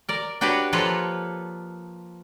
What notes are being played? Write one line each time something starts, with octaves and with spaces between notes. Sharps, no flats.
A#4 D5
D4 F#4 G4 B4 C#5 D5
F3 A#3 F4 A4 B4 C#5